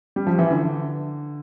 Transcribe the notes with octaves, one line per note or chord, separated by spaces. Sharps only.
G3
F3
E3
D3